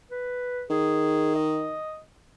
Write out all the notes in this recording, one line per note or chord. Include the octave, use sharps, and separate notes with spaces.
B4
D#3 G#4
D#5